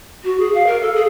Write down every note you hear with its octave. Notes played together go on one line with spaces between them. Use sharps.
F#4
G#4
F5
A#4
A4
G#4